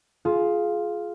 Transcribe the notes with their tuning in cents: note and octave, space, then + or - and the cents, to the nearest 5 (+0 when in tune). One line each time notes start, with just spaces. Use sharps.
F4 +0 G#4 +20